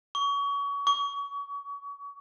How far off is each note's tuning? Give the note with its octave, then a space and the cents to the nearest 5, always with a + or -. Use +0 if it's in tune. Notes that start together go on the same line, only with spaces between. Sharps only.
C#6 +30
C#6 +40